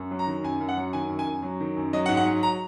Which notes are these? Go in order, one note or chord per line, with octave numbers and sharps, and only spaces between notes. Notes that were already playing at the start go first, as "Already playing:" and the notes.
Already playing: F#2
F#3
A#5
D#3
F#2 G#5
F#2
F#5
F#3
D#3 G#5
F#2
G#5
F#2
F#3
D#3
F#2
F#3 D#5
F#5
G#2
F#5
F#3
A#5